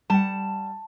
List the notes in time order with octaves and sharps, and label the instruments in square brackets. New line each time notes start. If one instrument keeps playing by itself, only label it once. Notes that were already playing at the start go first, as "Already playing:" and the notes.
[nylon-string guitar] G3 F#5 [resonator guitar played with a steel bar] A5